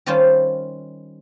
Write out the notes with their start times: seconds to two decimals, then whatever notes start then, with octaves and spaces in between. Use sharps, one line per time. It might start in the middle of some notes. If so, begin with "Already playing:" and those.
0.06 D#3 G3 C#4 F4 C5 A5